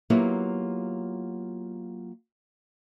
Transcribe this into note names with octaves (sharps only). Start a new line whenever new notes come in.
F#3 A#3 B3 E4 F4 G4